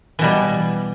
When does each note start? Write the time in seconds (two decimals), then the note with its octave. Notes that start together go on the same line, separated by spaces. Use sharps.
0.19 E3
0.21 B2
0.24 G3